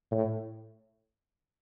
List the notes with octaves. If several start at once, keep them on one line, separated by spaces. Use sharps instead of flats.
A2